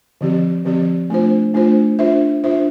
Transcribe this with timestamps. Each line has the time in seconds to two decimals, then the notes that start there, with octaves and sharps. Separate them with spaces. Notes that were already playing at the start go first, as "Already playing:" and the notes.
0.21 D3 F3 C4 G4 D5
0.65 D3 F3 C4 G4 D5
1.10 A3 D4 F4 C5
1.54 A3 D4 F4 C5
1.99 D4 F4 C5 E5
2.44 D4 F4 C5 E5